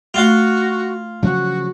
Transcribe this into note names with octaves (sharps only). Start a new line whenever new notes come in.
A3 F4 F#4 F5
C#3 F3 F#3 F#4